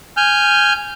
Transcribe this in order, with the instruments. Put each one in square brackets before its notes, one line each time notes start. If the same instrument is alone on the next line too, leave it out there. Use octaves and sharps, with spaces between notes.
[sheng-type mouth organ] G#5 F6 G6